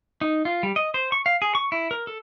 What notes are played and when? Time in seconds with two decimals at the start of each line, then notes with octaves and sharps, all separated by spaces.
0.21 D#4
0.45 F4
0.63 G3
0.76 D#5
0.94 C5
1.12 C#6
1.26 F5
1.42 G#4
1.55 C#6
1.72 E4
1.91 A#4
2.07 A4